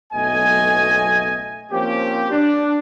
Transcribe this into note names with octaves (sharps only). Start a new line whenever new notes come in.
F#1 B1 A3 B3 D#5 G#5
F3 A#3 C4 C#4 G4
D4